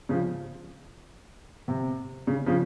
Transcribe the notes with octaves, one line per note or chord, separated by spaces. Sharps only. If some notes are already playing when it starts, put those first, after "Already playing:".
C#3 F3
C3
C#3
C#3 F3